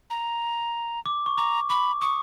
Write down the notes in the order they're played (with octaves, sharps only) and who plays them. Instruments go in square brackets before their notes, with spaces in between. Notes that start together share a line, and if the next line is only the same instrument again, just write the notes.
[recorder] A#5
[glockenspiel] D6
C#6
[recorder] A#5 [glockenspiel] D6
[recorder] B5 [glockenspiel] D6
[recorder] C#6 [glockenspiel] D#6